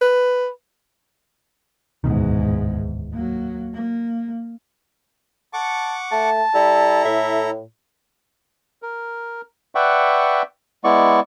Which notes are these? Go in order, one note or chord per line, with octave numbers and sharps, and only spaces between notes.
B4
D1 E2 G#2 B2 D#3
F#3 A#3
A#3
F#5 A5 C#6 D6
A3 A5
G3 E4 A4 A#5
A2 E5
A#4
B4 D5 E5 F#5 G5 C#6
G#3 B3 E4 D5 C#6